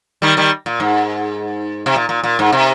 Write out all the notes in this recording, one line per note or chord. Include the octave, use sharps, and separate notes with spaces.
D#3 G3
D#3 G3
A#2
G#2
C3
A#2
A#2
A#2
G#2
C3